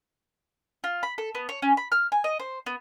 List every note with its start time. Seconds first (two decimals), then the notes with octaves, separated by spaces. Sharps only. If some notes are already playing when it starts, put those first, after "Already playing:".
0.84 F4
1.03 B5
1.18 A4
1.35 B3
1.49 C#5
1.62 C#4
1.77 B5
1.92 F6
2.12 G#5
2.24 D#5
2.40 C5
2.66 B3